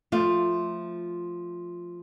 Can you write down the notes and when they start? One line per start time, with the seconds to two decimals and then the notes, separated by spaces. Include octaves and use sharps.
0.12 F3 A3 F4